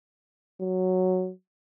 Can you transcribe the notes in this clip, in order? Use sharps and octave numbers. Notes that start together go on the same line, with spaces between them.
F#3